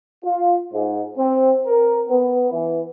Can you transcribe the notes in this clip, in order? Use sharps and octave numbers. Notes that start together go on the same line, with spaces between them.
F4
G#2
C4
A#4
B3
E3